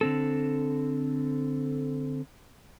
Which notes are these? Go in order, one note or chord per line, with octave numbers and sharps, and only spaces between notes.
D3 C4 A4